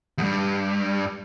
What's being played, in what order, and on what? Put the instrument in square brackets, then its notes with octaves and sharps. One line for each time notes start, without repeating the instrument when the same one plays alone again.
[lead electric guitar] E2 G2